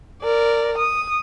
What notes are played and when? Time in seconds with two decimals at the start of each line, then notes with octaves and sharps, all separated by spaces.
0.23 A#4 D5
0.78 D#6